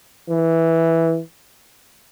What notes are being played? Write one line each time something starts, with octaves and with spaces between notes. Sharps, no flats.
E3